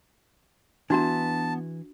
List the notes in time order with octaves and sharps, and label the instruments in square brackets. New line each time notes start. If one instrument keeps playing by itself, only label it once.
[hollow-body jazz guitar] E3 [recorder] B3 [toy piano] D4 F#4 A#5 [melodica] A5